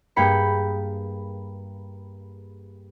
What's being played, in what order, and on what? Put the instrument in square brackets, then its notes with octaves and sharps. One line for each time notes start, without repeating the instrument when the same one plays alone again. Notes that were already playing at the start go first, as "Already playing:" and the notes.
[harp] G2 A#3 G#4 G5 B5 C#7